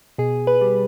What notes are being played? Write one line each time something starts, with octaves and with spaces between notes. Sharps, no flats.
B2 G#4
B4
G3